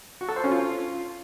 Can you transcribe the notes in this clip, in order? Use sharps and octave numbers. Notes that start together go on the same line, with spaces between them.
F#4
A4
C5
C#4
F4